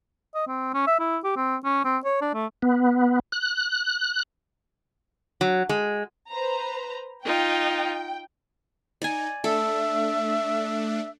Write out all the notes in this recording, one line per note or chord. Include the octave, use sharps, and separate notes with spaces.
D#5
C4
C#4
E5
E4
G4
C4
C#4
C4
C#5
D4
A3
B3
F#6
F#3
G#3
B4 C5 A#5
D#4 F4 G5
D#4 D5 G#5
A3 D4 A4 E5